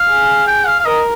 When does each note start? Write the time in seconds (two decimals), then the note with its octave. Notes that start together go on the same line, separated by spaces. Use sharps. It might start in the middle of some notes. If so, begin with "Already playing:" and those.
Already playing: F5
0.09 G#4
0.47 G5
0.67 F5
0.80 F5
0.85 A#4 D#5